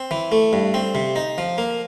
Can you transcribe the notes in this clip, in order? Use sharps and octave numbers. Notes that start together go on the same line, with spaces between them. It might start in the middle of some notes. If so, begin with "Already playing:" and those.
Already playing: C4
E3
A3
G2
C4
C3
D#4
F3
A#3